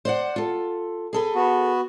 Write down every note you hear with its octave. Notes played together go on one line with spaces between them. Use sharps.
C5 D5 F#5
F4 A4
G#4 A4 B4
B3 F#4